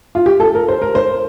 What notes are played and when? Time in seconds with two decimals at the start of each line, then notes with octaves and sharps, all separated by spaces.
0.15 F4
0.26 G4
0.40 A4
0.55 A#4
0.68 C5
0.82 A#4
0.95 C5